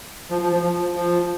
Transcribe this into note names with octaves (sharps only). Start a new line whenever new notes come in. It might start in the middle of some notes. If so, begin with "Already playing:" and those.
F3
F3
F3
F3
F3